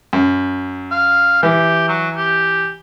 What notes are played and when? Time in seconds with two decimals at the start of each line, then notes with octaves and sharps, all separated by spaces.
0.13 F#2
0.92 F5
1.43 E3 G4
1.88 F#3
2.17 G4